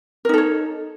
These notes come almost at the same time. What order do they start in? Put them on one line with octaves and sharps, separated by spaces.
A#4 D#4 A4 C#5